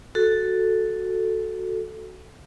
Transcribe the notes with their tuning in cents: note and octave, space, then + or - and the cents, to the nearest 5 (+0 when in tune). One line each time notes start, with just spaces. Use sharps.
F#4 +0 A4 +0